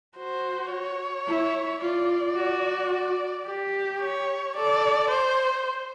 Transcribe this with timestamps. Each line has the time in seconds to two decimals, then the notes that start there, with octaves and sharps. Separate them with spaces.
0.18 F#4 C5
0.72 C#5
1.28 E4
1.82 F4 D5
2.36 F#4
2.92 D5
3.47 G4
4.01 C#5
4.56 A4 D5
5.10 C5